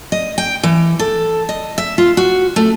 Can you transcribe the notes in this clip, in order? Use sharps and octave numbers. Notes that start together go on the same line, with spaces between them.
D#5
G5
E3
A4
D#5
E5
F4
F#4
A3